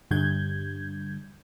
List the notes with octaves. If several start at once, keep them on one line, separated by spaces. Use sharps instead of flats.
G2 D3 G3 G6 G#6